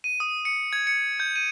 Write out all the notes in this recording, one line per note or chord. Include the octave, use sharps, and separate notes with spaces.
D#7
D#6
C#7
G#6
C#7
G6
D#7